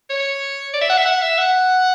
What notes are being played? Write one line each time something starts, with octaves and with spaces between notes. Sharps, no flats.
C#5
D5
E5
F#5
E5
F#5
E5
F#5